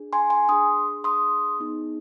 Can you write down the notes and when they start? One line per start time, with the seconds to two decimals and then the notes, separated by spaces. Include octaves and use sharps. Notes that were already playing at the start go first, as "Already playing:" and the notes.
Already playing: D4 G#4
0.13 G#5 C6
0.30 G#5 C6
0.49 D4 G#4 C6 D#6
1.04 C6 D#6
1.60 B3 D#4 G#4